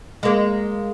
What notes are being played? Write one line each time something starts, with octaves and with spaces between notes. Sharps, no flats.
G#3 A#3